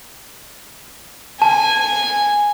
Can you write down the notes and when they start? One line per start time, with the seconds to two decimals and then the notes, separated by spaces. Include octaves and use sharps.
1.42 G#5 A5